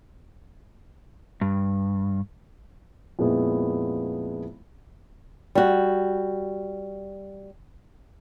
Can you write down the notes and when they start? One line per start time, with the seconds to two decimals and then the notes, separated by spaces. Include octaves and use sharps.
1.41 G2
3.19 F2 A#2 G#3 B3 E4
5.55 G3 F#4